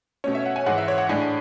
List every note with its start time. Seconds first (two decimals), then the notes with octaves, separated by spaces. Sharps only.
0.24 B2 A3 C#4 C#5
0.35 E5
0.46 F#5
0.56 G#5
0.66 G#2 E3 G#3 F#5
0.78 E5
0.88 C#5
0.98 F#5
1.09 A2 G#3 D4 G#5